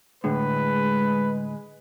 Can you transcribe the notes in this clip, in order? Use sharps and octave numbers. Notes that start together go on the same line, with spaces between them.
A2 D3 G#3 B4